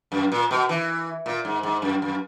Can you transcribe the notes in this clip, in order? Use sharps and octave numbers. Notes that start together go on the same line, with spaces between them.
F#2
A#2
B2
E3
A#2
G#2
G#2
F#2
F#2